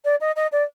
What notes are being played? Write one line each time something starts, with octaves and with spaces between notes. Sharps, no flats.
D5
D#5
D#5
D5